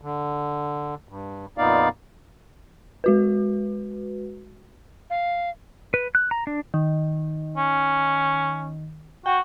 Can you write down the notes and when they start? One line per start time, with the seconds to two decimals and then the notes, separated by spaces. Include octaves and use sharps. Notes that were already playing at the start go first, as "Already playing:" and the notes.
0.02 D3
1.09 G2
1.58 F2 A#2 B3 D#4 D5 F5
3.04 G#3 F#4 B4
5.10 F5
5.94 B4
6.15 F#6
6.31 A#5
6.47 D4
6.74 D#3
7.57 C#4
9.26 F#4 G5